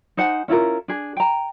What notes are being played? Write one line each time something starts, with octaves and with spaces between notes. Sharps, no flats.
D#4 C5 F#5 G#5
C#4 E4 F4 A#4
D4 G#4
G5 A#5